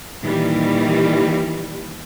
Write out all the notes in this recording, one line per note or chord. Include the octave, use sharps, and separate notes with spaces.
A#2 D#3 E3 G3